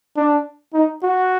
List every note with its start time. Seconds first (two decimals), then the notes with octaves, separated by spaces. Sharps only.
0.17 D4
0.74 D#4
1.03 F#4